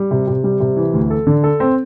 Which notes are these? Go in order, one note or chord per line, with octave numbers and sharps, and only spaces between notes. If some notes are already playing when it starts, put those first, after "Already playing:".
Already playing: G3
C3
C3
G3
C3
E3
D2
A4
D3
A4
C4